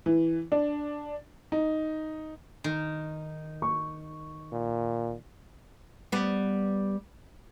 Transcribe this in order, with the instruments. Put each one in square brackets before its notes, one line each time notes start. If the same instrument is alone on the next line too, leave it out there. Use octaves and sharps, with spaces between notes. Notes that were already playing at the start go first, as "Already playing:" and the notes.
[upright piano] E3
D4
D#4
[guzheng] D#3
[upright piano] C#6
[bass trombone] A#2
[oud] G3 B3